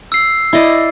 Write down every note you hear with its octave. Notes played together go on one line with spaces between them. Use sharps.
E6 C7
E4 D5 D#5